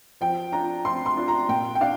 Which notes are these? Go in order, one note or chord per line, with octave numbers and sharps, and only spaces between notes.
F3 G5
D4 F4 A#5
F3 C6
C6
D4 F4
A#5
A#2 G5
G5
D4 F5